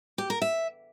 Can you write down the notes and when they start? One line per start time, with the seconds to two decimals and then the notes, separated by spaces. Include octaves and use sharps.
0.18 G4
0.30 A#4
0.42 E5